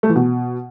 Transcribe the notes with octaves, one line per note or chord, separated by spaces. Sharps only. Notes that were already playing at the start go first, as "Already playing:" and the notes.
A3
E3
B2